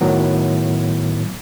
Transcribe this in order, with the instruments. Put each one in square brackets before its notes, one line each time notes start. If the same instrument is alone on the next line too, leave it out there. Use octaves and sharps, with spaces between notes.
[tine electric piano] A2 D#3 F#3 B3